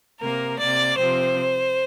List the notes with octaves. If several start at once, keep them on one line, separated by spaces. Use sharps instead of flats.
C3 A#3 A#4
C3 A#3 D5
C3 F3 C4 C5